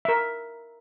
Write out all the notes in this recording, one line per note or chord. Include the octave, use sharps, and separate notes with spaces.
A#4 E5